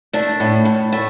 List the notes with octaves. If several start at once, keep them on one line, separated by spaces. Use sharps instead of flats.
A3 D4
A2
A2
A3